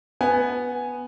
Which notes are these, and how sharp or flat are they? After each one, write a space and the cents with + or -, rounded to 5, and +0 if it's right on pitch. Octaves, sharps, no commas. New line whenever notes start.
B3 +0 G#5 +0